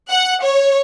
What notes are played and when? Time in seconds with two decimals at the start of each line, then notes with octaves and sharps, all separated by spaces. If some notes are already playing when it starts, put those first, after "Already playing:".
0.11 F#5
0.42 C#5